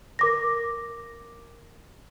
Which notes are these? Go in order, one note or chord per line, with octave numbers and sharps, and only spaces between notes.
A#4 D6 A#6